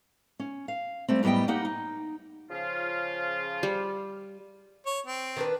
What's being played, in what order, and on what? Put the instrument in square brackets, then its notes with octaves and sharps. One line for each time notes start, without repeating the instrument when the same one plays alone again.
[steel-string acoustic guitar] C#4
F5
G3 A3 C4
F#2 A2 G3 B3 D#5 G5
A#3 D#4 G4 F#5
D#4
[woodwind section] C#3 F3 F4
[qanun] G3
[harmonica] C#5
C4
[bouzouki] D#3 D4 B4